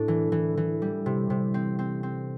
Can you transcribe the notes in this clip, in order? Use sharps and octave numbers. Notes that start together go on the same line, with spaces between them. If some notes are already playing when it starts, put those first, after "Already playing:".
Already playing: A2 D4
E3
E3
E3
G3
C3
C3
C4
C4
C4